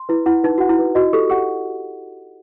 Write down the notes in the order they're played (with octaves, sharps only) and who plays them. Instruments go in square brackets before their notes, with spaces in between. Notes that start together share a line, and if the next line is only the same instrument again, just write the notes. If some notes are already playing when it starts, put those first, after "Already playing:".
Already playing: [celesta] C6
[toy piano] E4 [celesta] B4
[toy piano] E4 [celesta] F#5
[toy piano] D#4 [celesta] B4
[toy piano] F#4 [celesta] F#5
[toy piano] E4
[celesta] B4
[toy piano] F#4 [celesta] D#5
[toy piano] G4 [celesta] A4
[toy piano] G4 [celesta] F#5